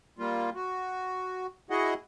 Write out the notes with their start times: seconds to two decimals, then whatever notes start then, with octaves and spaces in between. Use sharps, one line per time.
0.19 G3 A#3 F4
0.55 F#4
1.70 E4 F#4 G#4 D#5 F#5